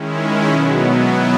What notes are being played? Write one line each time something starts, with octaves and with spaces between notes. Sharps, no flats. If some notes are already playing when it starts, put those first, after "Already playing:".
Already playing: D#3 G#3 C#4 E4
B2 F#3 B3
F#3 B3 E4